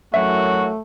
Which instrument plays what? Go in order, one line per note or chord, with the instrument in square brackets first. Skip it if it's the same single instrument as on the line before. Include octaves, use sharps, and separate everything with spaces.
[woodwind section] F#2 E3 F#3 [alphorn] A3 [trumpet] F#4 [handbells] E5